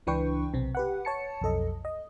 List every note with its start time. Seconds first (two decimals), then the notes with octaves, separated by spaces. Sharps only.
0.07 C#2 E3 D4 B4 G5 C#6
0.53 B1 C3 C4
0.75 G4 B4 F#5
1.05 C#5 A5 C#7
1.41 B1 F2 A4 D#5
1.85 D#5